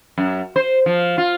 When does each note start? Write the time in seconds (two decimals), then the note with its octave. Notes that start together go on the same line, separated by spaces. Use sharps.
0.18 F#2
0.56 C5
0.86 F3
1.18 F4